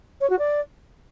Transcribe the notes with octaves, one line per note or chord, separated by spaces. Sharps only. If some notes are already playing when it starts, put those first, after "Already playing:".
C#5
F#4
D5